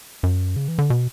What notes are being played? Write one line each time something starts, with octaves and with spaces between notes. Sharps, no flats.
F#2
C#3
E3
D3
B2